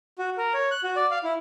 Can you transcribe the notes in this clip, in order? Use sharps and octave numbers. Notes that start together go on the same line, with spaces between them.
F#4
A#4
C#5
F#6
F#4
D5
F5
E4